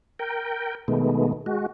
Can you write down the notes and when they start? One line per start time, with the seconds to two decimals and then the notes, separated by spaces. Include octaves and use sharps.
0.19 A#4 G5
0.88 B2 D#3 G#3 A3 B3
1.46 G#3 F#4